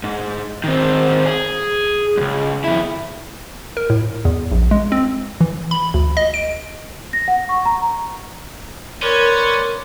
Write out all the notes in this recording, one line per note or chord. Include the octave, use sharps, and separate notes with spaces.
G#2
D#3 C4
G#4
C#2 F#2
F2 E4
A#4
A2
E2
A#1
G#3
C4
E3
B5
D2
D#5
D7
A#6
F#5
C#6
A#5
C#4 A#4 B4 C#5 D5 C6